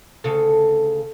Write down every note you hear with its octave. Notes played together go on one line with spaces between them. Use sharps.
D2 C#3 A4